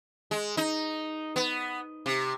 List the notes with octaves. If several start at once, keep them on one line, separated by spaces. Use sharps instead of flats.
G#3
D#4
B3
C3